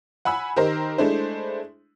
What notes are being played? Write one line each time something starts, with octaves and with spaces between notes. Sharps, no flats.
F#5 G#5 B5 E6
D#3 G4 A#4 C5
G#3 A3 D4 E4 C5